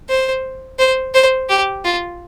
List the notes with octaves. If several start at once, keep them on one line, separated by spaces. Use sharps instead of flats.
C5
C5
C5
G4
F4